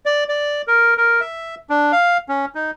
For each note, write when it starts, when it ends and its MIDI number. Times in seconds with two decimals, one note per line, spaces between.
0.05 0.24 74
0.29 0.62 74
0.67 0.94 70
0.97 1.21 70
1.21 1.55 76
1.70 1.92 62
1.92 2.17 77
2.29 2.45 61
2.55 2.71 63